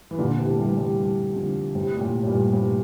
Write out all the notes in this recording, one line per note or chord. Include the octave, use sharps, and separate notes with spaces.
E3
A#2 D3
C3 E3
A3
E3 G3
E3 G3
E3 G3
D3 F3
A2 C3
A#2
A2
A2
G2 A#2
A2 C3